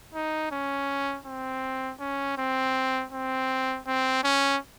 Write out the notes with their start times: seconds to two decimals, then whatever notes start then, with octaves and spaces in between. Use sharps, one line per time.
0.14 D#4
0.52 C#4
1.26 C4
2.00 C#4
2.38 C4
3.12 C4
3.87 C4
4.24 C#4